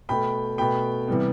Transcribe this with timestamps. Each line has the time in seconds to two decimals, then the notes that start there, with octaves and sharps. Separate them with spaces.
0.09 B2 A3 G5 B5
0.58 B2 A3 G5 B5
1.08 C3 E3 G3 B3